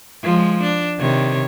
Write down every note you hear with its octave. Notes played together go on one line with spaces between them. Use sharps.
F3 G#3
D4
C3 D#3 C#5